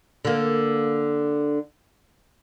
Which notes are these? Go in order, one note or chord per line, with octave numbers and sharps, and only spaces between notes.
D3 A#3